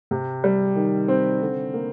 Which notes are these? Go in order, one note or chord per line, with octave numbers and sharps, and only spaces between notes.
C3
G3
D#3
C4
D3
A#3